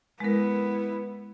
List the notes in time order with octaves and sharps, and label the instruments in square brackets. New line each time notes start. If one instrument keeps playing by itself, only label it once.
[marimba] G#3 A#4 [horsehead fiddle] B3 E4